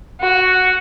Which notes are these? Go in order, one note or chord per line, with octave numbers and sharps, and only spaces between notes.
F#4